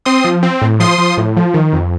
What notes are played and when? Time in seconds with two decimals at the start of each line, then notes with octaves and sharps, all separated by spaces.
0.05 C4 C6 D#6
0.25 F3
0.43 C4
0.62 A2
0.80 F3 C6 D#6
0.98 F3
1.18 A2
1.37 F3
1.54 D#3
1.73 F2